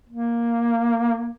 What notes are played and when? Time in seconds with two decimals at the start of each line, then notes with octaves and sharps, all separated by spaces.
0.10 A#3